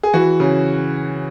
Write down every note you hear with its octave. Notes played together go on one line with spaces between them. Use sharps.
G#4
E3 F#4
C#3